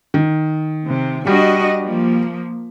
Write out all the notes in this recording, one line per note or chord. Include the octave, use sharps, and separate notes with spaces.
D#3
C3
G3 D4 F#4 D#5
F3 A#3